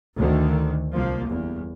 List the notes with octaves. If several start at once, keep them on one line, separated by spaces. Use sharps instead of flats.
D2 D3 D#3
C2 F3 A#3
G1 E2